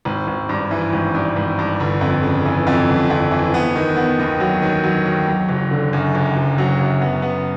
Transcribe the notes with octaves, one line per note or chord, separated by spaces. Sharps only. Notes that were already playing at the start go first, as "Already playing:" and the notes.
G#1
G#1
G2
E3
G#1
G2
G#1
G2
G1
F2
C#3
E3
F2
G1
F2
E3
B3
D#3
B3
D#2
F#3
D#3
F#3
D#2
F#3
F#1
D3
F#2
F#1
F#1
F#3
F#2
B3
B3